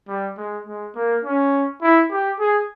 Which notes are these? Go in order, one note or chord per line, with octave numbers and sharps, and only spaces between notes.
G3
G#3
G#3
A#3
C#4
E4
G4
G#4